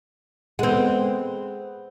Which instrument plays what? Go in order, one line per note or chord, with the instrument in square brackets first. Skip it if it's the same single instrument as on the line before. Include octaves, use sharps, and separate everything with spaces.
[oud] G#3 C4 [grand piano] B3 A4 F#5